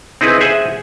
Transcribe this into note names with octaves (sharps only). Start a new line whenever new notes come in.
C4 D#4 E4 G#4 B4
G#4 C5 E5 F#5 G#5